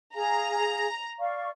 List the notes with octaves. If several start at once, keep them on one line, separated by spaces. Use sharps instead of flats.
G#4 F5 G#5 A#5
D5 F5 C#6